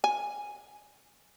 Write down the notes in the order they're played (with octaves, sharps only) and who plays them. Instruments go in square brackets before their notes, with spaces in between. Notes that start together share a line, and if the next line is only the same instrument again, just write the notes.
[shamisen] G#5